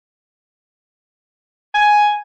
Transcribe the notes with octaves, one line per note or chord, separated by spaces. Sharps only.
G#5